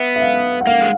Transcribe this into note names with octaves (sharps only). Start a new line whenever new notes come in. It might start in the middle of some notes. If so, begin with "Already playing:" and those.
Already playing: B3 E5
E5
F5
F#5
A#3 F5
G#3